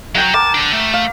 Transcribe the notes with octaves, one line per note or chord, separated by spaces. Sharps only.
F#3 F#5 G5 A#5
A#4 A5 D6
D3 D4
A3
F5